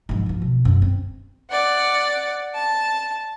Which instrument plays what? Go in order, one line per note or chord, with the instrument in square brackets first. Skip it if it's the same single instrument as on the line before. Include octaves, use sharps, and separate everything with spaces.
[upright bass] G#2 F3
D3 F3
B2
F#2
C4
[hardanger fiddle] D5 F#5
A5